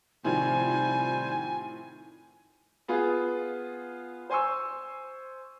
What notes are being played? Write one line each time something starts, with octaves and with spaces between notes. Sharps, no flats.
A2 C3 D#3 F3 G3 C5 G#5
B3 F4 G#4
C5 G#5 C6 C#6 E6